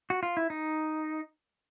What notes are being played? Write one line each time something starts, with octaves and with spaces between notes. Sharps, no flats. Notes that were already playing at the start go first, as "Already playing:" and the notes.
F#4
F4
E4
D#4